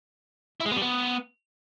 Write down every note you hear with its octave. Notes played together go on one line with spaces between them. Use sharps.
E4
G#3
B3
G3
B3